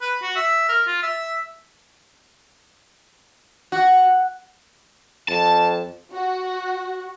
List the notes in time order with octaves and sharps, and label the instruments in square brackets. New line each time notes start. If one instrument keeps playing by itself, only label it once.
[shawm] B4
F#4
E5
A#4
F4
E5
[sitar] F#4
[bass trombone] F2 [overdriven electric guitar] A5
[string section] F#4